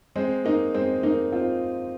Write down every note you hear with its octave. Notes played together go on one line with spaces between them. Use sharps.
G#3 C4
A#3 D#4
G#3 C4
A#3 D#4
C4 F4